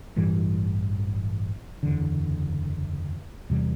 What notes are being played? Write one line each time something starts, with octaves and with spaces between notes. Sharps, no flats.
A1 G2 E3 G3
F#1 E2 D3
E2 C3 E3 G3